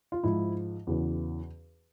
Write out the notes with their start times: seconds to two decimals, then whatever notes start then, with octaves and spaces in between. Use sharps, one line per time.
0.12 F4
0.23 G#2 F3 E4
0.87 E2 C#3 E3 F#4